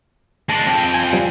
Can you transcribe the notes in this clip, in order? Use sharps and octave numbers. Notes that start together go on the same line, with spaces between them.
G#3 D4 A5
F2 G5
G#5
F3 G3